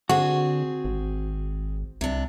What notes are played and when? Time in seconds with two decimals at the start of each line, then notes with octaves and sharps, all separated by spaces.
0.09 D3 C4 F#4 G#4
0.85 G#1
2.01 C2 C3 D4